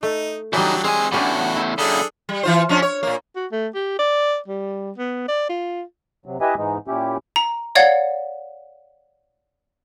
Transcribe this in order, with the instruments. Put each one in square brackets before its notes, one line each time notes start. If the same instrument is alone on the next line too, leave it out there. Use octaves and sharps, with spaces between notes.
[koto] A3 [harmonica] D#4
[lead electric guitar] C#3 D#4 [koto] E3 G3 [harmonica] F#3 D4
[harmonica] G#3 [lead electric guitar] C4 G#5 [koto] C#5
[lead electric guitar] E2 A2 [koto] G3 C#4 D4 [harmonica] F#4
[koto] E4 C5
[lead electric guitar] F#2 C#3 [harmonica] D4 G#4 A4
[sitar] G3
E3 F4 C5
F3 C#4 D4
C#5
A#2 A#3
[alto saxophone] F#4
A3
G4
D5
G3
B3
D5
F4
[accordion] C3 F#3
E4 G4 B4 D#5 E5 G#5
G#2 E3 G#3 D#4
A#2 C#4 E4 G4
[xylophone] A#5
C#5 D5 F5 F#5 G#6 C#7